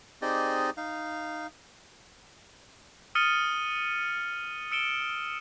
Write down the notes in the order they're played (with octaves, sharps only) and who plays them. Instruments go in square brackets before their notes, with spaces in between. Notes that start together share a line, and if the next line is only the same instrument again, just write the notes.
[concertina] C4 D#4 G4 G#4 D5 D#5
D#4 F5
[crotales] D#6 F6 A6 C#7 D#7 G7
E6 C#7 D7 E7 G7